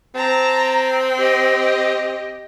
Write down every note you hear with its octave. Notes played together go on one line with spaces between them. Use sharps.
C4 A5 A#5
G4 D#5